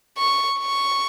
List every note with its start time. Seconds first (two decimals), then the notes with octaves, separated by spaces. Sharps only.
0.18 C#6
0.60 C#6